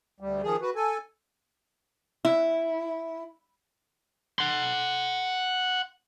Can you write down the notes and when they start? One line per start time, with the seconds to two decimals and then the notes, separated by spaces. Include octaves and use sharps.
0.20 D2 G3
0.43 D#3 F3 G#4
0.61 F#4 B4
0.75 A4 G#5
2.25 E4
4.39 F#5 C6